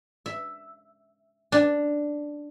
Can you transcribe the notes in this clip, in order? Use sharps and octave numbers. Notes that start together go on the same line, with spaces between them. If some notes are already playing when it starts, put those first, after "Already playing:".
E5
D4